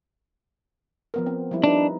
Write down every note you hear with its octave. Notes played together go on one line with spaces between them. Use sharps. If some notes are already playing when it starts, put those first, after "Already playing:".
F3 B3 A#4
C4
F3 G3 E4
D4 D#4 B4